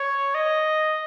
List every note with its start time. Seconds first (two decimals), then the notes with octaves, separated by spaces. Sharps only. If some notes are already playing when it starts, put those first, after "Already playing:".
Already playing: C#5
0.35 D#5